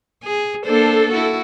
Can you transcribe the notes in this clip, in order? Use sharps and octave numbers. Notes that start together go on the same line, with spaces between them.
G#4
A#3 D4 A4 C5
E4 F#4